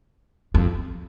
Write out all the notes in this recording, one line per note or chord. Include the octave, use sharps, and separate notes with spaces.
F2